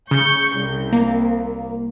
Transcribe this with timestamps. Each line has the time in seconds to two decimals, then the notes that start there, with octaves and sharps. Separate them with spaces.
0.11 C#3 C#6 G6
0.58 C2
0.93 A#3